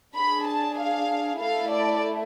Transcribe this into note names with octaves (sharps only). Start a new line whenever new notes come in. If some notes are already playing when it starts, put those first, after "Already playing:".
D4 G#4 B5
A5
F5
A3 E4 A4 F5
D5